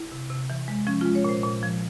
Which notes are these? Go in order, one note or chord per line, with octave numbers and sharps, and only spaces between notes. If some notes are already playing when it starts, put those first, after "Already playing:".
Already playing: E4
C3
C3
E3
G#3
F3 C#4
G#3 F4
C#5
A#2 C5
A#2
F3